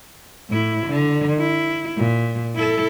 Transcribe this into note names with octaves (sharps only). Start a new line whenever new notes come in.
A2 E4
D3
E4
A#2
E4 A4